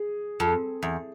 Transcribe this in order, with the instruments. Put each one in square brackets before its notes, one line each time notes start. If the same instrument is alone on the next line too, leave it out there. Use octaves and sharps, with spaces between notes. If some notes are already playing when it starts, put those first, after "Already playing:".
Already playing: [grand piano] G#4
[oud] F2
E2